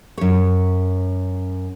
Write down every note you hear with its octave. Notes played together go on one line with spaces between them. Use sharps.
F#2 C#5